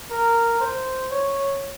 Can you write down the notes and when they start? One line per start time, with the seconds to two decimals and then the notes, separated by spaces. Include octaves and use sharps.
0.11 A#4
0.60 C5
1.11 C#5